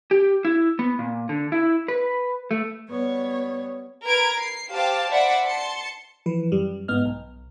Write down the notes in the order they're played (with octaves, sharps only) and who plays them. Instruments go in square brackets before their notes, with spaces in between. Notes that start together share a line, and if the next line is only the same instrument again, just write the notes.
[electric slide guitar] G4
E4
B3
A#2
D3
E4
B4
A3
[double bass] G3 B3 [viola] C#5
[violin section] A#4 B4 G#6 D7
C7
G4 C5 F5 A5 D6
C5 D5 E5 F#5 B5 D6
A5 C6 C#7
[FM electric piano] E3 F3 B4
F#2 G3
G1 G#2 B3 D#5 F6
B1